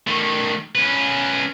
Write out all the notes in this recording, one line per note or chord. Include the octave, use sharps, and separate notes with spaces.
D#3 A3
C#4 B4